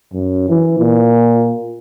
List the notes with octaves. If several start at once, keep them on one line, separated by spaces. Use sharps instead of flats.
F#2
E3
A#2